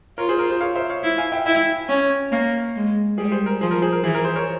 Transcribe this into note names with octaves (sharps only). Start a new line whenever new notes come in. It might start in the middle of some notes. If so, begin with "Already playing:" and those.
F4 A#4 C#5
G#4 C5
A#4
G#4 C5
C#5 F5
C5 E5
C#5 F5
E4
F5 G#5
E5 G5
E4 E5 G5
C#4
A#3 C#5 F5
G#3
G3 G#4
G#4 C5
A#4
F3 G#4
A#4
G#4 C5
A#4
E3 G#4
A#4
G#4 C5
A#4 C#5